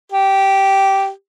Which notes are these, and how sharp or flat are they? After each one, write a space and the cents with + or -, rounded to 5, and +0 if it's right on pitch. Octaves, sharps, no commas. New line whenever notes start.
G4 -10